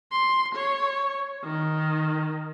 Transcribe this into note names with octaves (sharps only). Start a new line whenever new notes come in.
C6
C#5
D#3